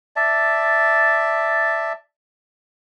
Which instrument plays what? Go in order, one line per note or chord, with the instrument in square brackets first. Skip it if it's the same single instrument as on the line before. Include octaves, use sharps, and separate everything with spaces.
[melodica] D5 E5 A5